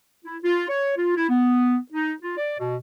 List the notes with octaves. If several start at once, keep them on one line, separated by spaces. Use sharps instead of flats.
E4
F4
C#5
F4
E4
B3
D#4
F4
D5
B2